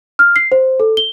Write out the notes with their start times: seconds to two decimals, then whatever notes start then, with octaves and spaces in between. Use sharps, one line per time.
0.19 F6
0.36 C7
0.52 C5
0.80 A4
0.97 G7